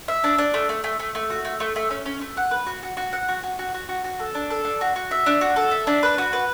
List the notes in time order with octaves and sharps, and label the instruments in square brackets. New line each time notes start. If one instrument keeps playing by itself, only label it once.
[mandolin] E5
D4
D4
A3
A3
A3
A3
A3
F#4
A3
A3
A3
C#4
C#4
A3
F#5
B4
F#4
F#4
F#4
F#5
F#4
F#4
F#4
F#4
F#4
F#4
A4
D4
A4
D4
F#4
F#4
E5
D4
F#4
A4
E5
D4
B4
F#4
B4